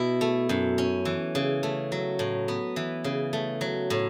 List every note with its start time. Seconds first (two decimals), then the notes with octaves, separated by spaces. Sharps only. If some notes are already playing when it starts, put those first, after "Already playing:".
Already playing: B2 E4
0.21 A3
0.49 F#2
0.78 C#4
1.05 E3
1.35 C#3
1.63 A3
1.92 F#3
2.19 A2
2.48 B3
2.76 E3
3.04 C#3
3.33 A3
3.61 F#3
3.90 A2